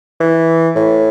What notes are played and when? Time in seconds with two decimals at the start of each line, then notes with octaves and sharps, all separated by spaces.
0.21 E3
0.75 A2